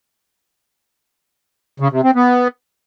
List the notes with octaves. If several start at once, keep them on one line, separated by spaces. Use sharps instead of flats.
C#3
C3
C4
B3